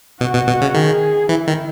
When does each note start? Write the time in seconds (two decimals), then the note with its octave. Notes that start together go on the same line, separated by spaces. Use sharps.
0.21 B2 F#4
0.35 B2
0.48 B2
0.61 C#3
0.75 D#3 G#4
1.29 E3 E4
1.48 D#3